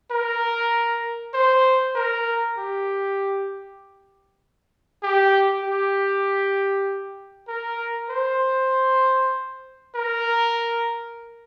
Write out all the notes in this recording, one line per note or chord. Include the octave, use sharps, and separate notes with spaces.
A#4
C5
A#4
G4
G4
G4
A#4
C5
A#4